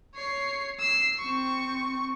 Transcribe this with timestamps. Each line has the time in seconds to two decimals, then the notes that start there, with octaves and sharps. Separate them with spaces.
0.15 C#5 C7
0.79 E6 C7
1.19 C4 C#6